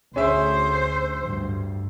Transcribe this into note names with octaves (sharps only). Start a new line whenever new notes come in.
D2 C#4 G#4 C5 E5
D2 G2